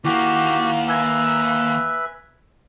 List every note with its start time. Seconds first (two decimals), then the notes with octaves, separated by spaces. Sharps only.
0.04 D#2 A#3 E4 F#4 G4 F#5
0.88 B4 E5 G#5 G#6 A#6